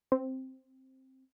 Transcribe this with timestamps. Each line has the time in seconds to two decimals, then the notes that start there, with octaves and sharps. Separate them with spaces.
0.12 C4